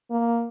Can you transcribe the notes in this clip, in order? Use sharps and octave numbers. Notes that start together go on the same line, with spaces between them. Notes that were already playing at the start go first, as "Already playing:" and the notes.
A#3